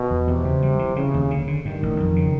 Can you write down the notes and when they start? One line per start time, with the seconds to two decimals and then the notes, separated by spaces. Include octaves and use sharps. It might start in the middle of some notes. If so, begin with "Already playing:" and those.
Already playing: B2
0.11 E2
0.27 E2 C3
0.45 C#3
0.62 G3
0.79 E3
0.96 C#3 E3
1.14 D#2
1.30 D3
1.47 D3
1.65 G2 D#3
1.83 A1
2.00 F2
2.16 C#3